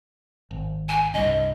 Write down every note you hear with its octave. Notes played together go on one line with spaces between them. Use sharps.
G#1
G#5
C2 G2 D#5